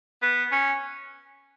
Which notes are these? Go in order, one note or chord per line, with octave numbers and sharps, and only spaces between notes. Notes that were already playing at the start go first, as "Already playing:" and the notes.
B3
C#4